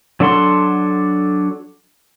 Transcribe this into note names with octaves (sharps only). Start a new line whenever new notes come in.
F#3 D4 A4 F#5 C6